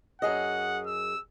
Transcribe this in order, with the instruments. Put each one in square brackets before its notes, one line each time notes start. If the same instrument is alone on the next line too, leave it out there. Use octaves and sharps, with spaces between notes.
[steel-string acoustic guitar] F#2 G#4 D#5 [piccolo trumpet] F#5
[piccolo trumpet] E6